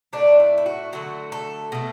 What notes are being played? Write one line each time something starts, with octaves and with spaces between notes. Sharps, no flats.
A2 A3 D4
E4
E4
F#4
D3 F#3 A3 F#4
A4
B2 A3